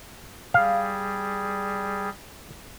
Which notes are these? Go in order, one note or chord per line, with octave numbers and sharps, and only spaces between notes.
G3 G#4 F5